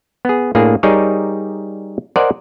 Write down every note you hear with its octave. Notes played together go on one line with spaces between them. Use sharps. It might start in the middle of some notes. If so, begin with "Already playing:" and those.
B3 G#4
A2 A#3 D4 G#4
G3 D#4 G#4 A#4 C#5 D5
A#4 C5 D5 D#5 F#5 G#5